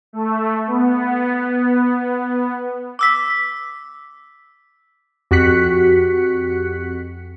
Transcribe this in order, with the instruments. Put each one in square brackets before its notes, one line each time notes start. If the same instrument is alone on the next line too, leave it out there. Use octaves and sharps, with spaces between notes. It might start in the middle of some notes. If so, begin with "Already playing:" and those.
[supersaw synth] A3
B3
[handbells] D6 E6 B6
[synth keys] F2 F#4 G4 F#6 B6 C#7